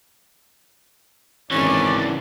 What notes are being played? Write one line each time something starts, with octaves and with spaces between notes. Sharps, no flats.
G#1 C#3 E3 C#4 D5